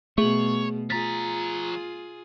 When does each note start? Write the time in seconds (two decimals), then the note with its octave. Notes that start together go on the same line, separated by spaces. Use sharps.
0.18 B2 A3 G#4 C#5 F#7
0.90 F3 F4 G#4 A#5 A6 B6